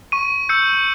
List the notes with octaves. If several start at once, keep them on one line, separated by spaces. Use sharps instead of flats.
C#6 D#7
E6 G6 C#7